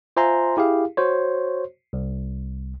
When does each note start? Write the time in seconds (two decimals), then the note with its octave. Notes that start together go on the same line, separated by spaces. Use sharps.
0.17 F4 C5 E5 G#5 A#5 C6
0.57 E4 G4 G#4 F5
0.97 F#4 C5 C#5
1.93 C2